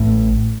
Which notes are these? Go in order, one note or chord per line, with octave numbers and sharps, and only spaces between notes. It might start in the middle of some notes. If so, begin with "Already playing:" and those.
Already playing: A1 A2